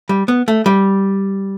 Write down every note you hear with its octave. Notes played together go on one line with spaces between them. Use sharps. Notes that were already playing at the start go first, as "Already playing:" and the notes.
G3
B3
A3
G3